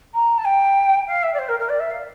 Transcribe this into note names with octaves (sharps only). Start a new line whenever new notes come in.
A#5
A5
G5
F5
E5
D5
C5
A#4
A#4
D5
E5
F5